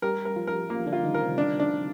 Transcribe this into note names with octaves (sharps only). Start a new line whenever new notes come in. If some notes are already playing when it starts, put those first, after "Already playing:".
G3 G4 A#4
A#4
F3 F4
A#4
F3 A#3 F4
D3 D4
F4
D#3 D#4
A#4
C3 C4
D4
D4